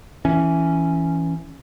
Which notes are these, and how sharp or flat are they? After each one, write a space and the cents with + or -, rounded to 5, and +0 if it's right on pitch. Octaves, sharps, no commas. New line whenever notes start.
E3 +0 C#4 +0